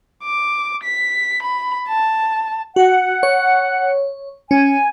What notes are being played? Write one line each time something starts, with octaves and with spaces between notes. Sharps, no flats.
D6
B6
B5
A5
F#4 F#5
C#5
C#4 G#5